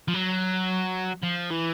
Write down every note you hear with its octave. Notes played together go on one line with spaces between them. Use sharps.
F3
F#3
F3
E3